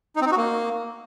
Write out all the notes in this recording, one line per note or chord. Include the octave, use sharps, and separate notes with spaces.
D#4
C4
D#4
F#4
A#3